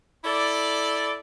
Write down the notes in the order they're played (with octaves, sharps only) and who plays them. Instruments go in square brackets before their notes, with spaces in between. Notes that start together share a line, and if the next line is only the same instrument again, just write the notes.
[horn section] E4 A4 D5